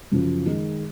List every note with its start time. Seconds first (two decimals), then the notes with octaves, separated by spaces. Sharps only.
0.12 F#2 C#3 F3
0.46 D#3 G#3 D#4 G#4